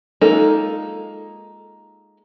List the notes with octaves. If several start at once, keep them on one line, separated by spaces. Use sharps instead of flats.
G#3 A#3 D#4 F4 A4